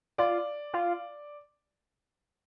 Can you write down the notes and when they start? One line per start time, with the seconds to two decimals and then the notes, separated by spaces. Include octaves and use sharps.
0.18 F4 D5
0.73 F4